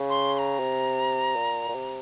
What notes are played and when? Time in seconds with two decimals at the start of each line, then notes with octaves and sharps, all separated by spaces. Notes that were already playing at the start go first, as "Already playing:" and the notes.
Already playing: C#3
0.10 C6
0.35 C6
0.38 A#5
0.60 C3
1.36 A#2
1.69 A#2
1.75 C3